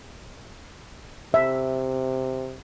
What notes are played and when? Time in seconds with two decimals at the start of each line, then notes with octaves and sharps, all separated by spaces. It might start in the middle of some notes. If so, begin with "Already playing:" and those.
1.34 C3 E5